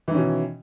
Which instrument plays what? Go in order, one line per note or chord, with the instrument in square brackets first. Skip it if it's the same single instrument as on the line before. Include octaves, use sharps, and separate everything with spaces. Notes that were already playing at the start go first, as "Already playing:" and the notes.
[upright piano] E3
D#3
C#4
B2